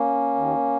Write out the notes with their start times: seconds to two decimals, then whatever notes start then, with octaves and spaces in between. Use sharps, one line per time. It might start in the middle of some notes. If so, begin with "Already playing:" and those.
Already playing: A#3 C#4
0.35 D#2 D#3